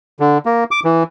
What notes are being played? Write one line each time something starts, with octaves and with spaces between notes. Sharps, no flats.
D3
A#3
D6
E3